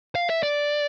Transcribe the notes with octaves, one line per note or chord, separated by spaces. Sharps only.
F5
E5
D5